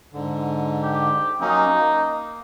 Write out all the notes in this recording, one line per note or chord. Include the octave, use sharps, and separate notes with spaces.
G#2 D3
G4
F#3 A#3 C#4 D#4
A#3